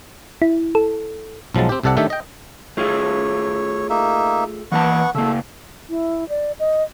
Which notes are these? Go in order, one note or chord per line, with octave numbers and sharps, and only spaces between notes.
E4
A4
B1 F3 F#3 G#3 A5
C4 G4
C2 C3 A4 D5 F#5 A5
D#3 A3 D4 G4 E5
D#5 G5
A3 F4 G#4 C#5
A#3 D#4 E5
E3 A#3 B3 F#5 A5 C#6
C#3 A3 A#3 E5
E4
D5
D#5